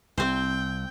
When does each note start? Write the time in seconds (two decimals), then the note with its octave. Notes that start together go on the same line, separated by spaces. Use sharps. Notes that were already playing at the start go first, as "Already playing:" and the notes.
0.18 C2 C4 C5 G5